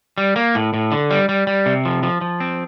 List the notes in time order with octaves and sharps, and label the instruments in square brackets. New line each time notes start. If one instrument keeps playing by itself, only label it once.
[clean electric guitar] G3
A#3
A2
A2
D3
G3
G3
G3
C3
F3
F3
F3
C4